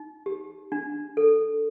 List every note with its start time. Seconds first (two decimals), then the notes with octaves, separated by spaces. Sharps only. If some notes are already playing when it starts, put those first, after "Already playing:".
Already playing: D#4
0.26 G4
0.72 D4
1.17 A4